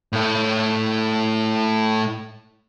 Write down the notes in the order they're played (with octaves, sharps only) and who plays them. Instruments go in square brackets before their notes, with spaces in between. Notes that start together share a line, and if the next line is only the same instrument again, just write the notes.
[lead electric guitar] A2 A3